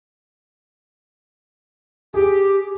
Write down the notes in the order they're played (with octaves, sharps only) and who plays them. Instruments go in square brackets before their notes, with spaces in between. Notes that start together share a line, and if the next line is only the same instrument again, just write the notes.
[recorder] G4 [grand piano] G#4